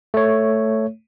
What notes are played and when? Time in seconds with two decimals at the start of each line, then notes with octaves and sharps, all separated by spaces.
0.14 A3 C#5